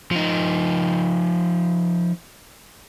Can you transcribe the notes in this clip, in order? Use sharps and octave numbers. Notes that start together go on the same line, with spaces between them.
F3 D#4